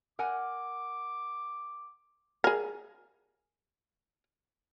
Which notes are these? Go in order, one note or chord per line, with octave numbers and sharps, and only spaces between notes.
A#4 F#5 G#5 D6
G#4 A#4